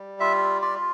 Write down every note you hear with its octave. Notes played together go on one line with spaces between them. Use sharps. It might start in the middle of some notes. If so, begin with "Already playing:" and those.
Already playing: G3
F4 E5
F4 D5